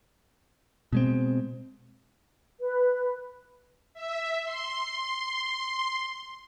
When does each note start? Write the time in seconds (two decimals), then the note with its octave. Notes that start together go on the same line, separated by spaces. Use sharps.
0.93 B2 G#3 C4
2.59 B4
3.94 E5
4.43 C6